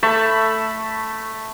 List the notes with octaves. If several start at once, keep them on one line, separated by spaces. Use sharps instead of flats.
A3 A5 B5 C#6